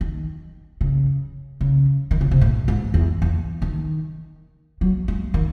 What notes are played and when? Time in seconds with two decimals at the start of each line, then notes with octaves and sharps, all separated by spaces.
0.01 D#3
0.81 C#3
1.61 C#3
2.11 D#3
2.21 C#3
2.31 C3
2.41 A2
2.68 G#2
2.94 E2
3.22 E2
3.62 D#3
4.81 F#3
5.08 G#3
5.34 D#3